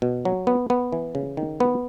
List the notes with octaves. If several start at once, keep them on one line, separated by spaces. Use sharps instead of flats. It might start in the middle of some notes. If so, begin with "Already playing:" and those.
B2
F#3
B3
B3
E3
C#3
D#3
B3